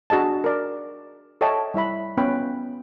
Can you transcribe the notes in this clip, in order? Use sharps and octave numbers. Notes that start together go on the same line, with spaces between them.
D4 F#4 G#4 D#5 A5
A#4 D5
A4 C#5 D#5 E5 G5 A5
G3 E4 E5 B5
B3 C#4 F4 B4 G5 B5